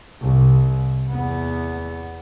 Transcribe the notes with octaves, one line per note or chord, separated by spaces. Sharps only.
C2
E2 B3